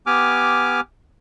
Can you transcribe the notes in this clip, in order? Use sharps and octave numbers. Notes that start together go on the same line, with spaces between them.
B3 G4 G#5 D6 F6